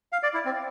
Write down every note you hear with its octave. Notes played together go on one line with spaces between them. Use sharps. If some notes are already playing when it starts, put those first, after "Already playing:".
F5
D5
E4
C4